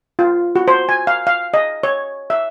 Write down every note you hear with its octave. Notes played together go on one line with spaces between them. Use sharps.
F4
F#4
C5
G#5
F5
F5
D#5
C#5
E5